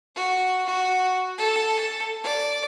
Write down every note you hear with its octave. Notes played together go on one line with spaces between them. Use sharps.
F#4
F#4
A4
D5